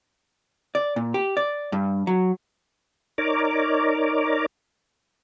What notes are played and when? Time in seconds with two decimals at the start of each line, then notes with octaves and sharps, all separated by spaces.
0.75 D5
0.96 A#2
1.14 G4
1.37 D5
1.72 G2
2.07 F#3
3.18 D#4 A#4 C#5 D5 A#5 D6